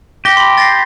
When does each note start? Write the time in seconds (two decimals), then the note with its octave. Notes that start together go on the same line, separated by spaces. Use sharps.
0.25 G4 A#6 G7
0.37 B5 C6
0.58 A6 A#6 C7